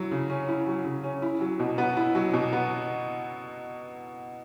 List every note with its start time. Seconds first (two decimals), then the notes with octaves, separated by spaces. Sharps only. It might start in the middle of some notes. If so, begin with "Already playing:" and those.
Already playing: F#3 E4
0.11 C#3
0.30 C#4
0.49 E4
0.67 F#3
0.85 C#3
1.03 C#4
1.22 E4
1.41 F#3
1.60 B2
1.78 B3
1.97 E4
2.15 F#3
2.34 B2
2.53 B3